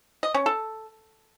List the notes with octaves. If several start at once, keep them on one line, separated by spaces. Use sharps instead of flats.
D#5
C#4
A4